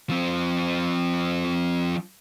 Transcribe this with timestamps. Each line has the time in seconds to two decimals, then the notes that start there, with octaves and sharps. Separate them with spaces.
0.10 F3 C4